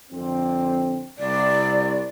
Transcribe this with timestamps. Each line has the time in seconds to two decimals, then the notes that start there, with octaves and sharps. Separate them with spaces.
0.11 F2 D3 C4
1.18 C2 D5